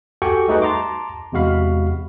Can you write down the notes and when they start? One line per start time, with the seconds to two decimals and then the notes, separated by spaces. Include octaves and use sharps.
0.22 F#4 G4 A4 G5 G#5 C#6
0.48 G3 A3 D#4 F#4 G#4 B4
0.62 A5 A#5 C6 D6
1.32 E2 C3 G#3 F#4 F5 B5